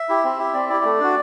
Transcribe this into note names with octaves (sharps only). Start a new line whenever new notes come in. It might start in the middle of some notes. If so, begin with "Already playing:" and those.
Already playing: E5
E4 G4
C4
E4 G4
C4 D5
E4 G4 D5
A3
D4 F#4